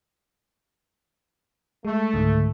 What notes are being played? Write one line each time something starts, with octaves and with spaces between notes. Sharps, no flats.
G#3 A3
C#2 G#2 D3